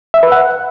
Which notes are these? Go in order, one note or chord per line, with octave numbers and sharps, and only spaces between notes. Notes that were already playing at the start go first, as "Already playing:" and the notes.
E5
B4
F#5